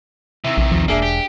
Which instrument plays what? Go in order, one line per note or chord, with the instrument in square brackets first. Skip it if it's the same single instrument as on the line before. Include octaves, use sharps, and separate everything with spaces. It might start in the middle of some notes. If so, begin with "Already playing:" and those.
[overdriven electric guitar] C3 D#3 [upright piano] E4
[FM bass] A#1
[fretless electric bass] D#2 F3
[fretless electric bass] E1 [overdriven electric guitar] A#3 [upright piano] D4 G#4 E5
[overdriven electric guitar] G4